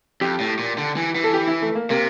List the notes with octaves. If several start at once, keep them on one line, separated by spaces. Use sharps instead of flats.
F2 G4
A2
A#2
D3
E3
E3
A4
G4
E4
A3
A#3
C3 A#3